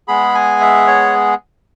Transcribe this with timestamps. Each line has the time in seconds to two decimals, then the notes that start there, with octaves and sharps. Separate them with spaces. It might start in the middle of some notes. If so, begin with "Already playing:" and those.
0.08 G#3 B3 G#4 B5
0.35 G#5
0.61 E5
0.87 C#5